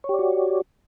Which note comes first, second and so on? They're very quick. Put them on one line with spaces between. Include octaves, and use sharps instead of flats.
C#5 G4 D5 F#4